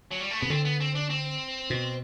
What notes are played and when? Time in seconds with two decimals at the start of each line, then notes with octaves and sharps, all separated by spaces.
0.11 F#3
0.20 G3
0.31 A3
0.41 C3 B3
0.50 D3 C4
0.65 B3
0.80 C4
0.95 D4
1.10 C4
1.70 B2